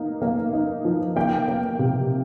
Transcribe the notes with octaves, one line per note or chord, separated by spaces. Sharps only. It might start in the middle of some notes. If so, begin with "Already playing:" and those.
Already playing: A#3 D#4
A#3
D#4
F3
A#3 G5
A#3
C3